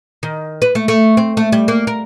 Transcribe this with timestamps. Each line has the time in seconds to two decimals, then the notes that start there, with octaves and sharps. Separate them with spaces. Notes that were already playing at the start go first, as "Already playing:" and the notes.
0.23 D#3
0.62 B4
0.75 A3
0.88 A3
1.17 C4
1.37 A3
1.52 G3
1.68 A#3
1.87 A#4